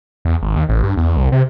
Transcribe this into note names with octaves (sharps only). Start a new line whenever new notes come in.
E2
G#1
D#2
A1
G2
E2
C2
C3